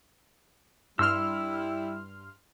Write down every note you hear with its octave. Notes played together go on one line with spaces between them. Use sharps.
G2 G3 E4 C6 E6 F6